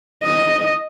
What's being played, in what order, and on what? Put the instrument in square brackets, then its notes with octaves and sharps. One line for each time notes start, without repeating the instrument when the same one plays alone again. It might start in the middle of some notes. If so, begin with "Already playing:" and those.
[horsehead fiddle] D#5